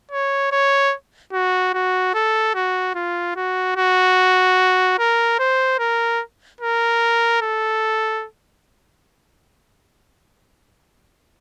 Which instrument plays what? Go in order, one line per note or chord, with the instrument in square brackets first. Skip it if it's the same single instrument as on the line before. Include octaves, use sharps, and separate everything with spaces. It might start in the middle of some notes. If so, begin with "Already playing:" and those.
[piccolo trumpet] C#5
C#5
F#4
F#4
A4
F#4
F4
F#4
F#4
A#4
C5
A#4
A#4
A4